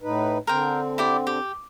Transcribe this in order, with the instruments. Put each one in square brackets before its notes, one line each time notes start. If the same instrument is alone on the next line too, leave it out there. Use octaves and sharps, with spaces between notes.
[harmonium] A2 D#4 B4
[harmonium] D3 C4 [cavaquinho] A#4 C5 G5
[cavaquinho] E4 G4 D5
G4